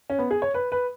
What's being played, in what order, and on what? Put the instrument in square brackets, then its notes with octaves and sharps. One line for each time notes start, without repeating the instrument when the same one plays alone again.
[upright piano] C#4
B3
G#4
C#5
B4
B4